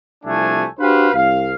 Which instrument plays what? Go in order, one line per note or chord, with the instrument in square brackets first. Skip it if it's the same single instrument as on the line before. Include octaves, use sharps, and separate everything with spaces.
[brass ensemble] C2 C3 F3 A3 D4 G#5
D4 F#4 G4 B4 C5 F5
C2 F5